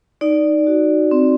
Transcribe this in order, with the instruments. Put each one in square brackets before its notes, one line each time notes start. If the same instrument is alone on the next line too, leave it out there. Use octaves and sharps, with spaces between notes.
[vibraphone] D#4 D5
F#4
C4